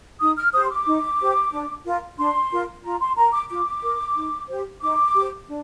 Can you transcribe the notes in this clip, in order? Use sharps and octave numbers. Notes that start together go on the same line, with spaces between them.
D#4 D#6
F6
G4 C5 D#6
C6
D6
D#4
G4 C5
D4
F4 A#4
D4 C6
F4 A#4
F4 A#5
C6
A#4 A#5
D6
F4 D6
A#4
D#4
G4 C5
D#4 D6
G4
C5
D4